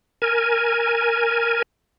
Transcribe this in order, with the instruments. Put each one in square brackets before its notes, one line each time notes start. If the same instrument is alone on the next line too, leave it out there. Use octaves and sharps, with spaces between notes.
[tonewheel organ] A#4 G#5